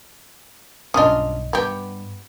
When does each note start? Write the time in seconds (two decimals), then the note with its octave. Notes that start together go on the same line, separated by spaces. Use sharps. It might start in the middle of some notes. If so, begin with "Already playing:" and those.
0.94 B1 G2 C#4 D4 F4 D#5 D#6
1.53 G2 B3 G4